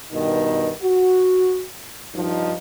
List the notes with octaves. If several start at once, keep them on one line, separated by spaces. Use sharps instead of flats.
G2 B2 D#3 D#4
F#4
G2 F3 D#4